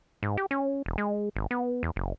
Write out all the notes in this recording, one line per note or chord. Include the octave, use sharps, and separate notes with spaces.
G#2
G4
C#4
E1
G#3
G#1
B3
E2
F#1